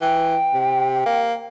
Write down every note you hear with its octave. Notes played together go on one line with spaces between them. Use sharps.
E3 G5
C3
A#3